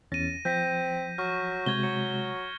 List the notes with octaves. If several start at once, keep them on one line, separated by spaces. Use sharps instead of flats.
E2 C#4 A6 A#6 D#7
F3 C4 G6 A#6 B6
F#3 C#6 F6
C3 G#3 F#4 G6 G#6 G7
F#3 C#7